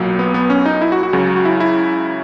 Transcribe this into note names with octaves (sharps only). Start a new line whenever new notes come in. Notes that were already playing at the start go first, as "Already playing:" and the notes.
Already playing: B1 A#2 F#3
B3
B3
C#4
D#4
E4
F#4
F#4
C#2 C#3 F#3
F#4
E4
E4